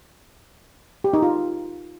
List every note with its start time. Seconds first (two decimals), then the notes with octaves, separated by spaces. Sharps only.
1.04 G4
1.13 D#4
1.23 F4